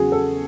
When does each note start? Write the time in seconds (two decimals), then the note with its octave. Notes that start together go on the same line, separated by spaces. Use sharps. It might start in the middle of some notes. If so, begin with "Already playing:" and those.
Already playing: E2 C#3 F#3 F#4 G#4
0.12 A4